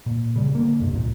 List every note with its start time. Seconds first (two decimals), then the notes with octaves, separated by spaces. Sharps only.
0.06 A#2
0.36 C#3 G3
0.55 D3 A#3
0.80 E1 G2 C3
0.92 C2 A#2